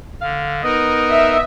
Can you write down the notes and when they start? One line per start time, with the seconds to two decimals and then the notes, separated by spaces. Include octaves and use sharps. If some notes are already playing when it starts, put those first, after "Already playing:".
0.21 D3 F5
0.64 B3 D#4 A#4 D#5
1.09 E5